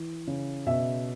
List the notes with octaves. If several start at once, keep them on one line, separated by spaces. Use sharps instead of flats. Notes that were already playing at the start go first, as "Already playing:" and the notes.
Already playing: E3
C#3
B2 E5